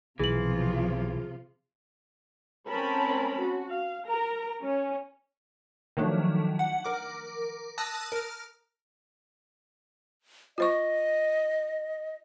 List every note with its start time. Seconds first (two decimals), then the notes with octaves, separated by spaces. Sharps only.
0.19 B1 C3 E3 F3 F4 G#4 F#7
2.69 A3 C4 C#4 A#4 A5 B5
3.41 F#4
3.71 F5
4.06 A#4 A#5
4.62 C#4
5.97 D#3 F3 F#3 A3 D4
6.59 F#5
6.85 A#4 D6
7.78 A5 D#6 E6 F#6 A#6
8.12 A#4 F6
10.58 F4 C5 D#5 C#6